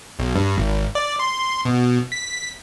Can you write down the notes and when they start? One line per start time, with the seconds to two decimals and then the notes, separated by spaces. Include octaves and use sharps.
0.19 B1
0.36 G2
0.58 G#1
0.95 D5
1.19 C6
1.65 B2
2.12 B6